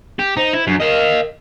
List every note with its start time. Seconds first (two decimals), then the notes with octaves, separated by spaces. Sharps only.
0.19 G4
0.37 D#4 C5
0.53 E4
0.67 F#2 D4
0.80 A#4 D#5 F5